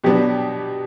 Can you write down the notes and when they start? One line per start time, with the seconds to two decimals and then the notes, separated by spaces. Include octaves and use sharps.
0.04 B2 F#3 B3 D4 G4